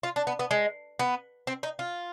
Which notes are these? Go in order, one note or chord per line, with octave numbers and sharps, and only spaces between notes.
F4
D4
B3
B3
G#3
B3
C4
D#4
F4